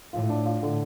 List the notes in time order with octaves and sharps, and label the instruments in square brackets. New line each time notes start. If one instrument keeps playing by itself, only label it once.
[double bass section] A2 [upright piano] F4
[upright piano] D4
F4
D3